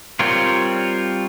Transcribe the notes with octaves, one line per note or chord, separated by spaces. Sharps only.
G3 C4 F4 A#4 C#5